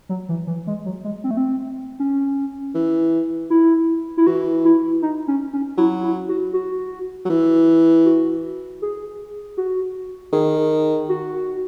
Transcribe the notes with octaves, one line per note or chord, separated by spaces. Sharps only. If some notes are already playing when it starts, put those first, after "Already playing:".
F#3
E3
E3
G#3
F#3
G#3
C4
A3
C4
C#4
E3
E4
E4
E3 F#4
E4
D#4
C#4
C#4
F#3 E4
E4
F#4
F#4
F#3
E3
F#4
G#4
F#4
D#3 G#4
F#4